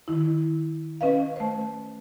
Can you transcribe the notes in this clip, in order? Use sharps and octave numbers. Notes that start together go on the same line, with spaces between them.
D#3 E4
C#4 B4 D#5 F5
A3 C5